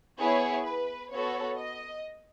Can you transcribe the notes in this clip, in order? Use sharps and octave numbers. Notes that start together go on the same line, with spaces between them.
B3 E4 G#4 C#5
B4
B3 F#4 A4 C#5
D#5